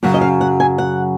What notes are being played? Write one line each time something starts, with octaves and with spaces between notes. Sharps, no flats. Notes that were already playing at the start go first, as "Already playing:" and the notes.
F#2 C#3 F#3 F#5
D#5
F5
F#5
G#5
F#5